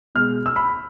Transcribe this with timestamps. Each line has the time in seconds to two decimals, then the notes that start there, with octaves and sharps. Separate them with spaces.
0.15 B2 G#3 F6
0.46 E6
0.56 B5